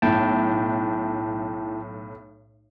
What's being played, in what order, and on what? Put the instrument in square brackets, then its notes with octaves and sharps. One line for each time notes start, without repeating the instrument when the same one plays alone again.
[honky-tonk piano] B1 A2 [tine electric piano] E4 G5 A5